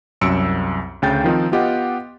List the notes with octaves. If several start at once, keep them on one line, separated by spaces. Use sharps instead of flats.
C2 F#2 E6 C#7 D7
D2 C#3 G5 G6 A6
D#3 F3 C4 D#4
B3 F4 G4 D#5 F#5